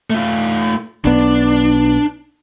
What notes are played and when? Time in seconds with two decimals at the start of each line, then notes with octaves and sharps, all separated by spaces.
0.10 A3 F4
1.05 B1 B3 D4